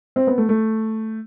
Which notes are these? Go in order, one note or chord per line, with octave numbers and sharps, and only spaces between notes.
C4
B3
A3
A3